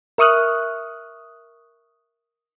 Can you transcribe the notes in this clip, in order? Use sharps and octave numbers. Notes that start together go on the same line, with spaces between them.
A#4 E5 C#6 D#6 F6 F#6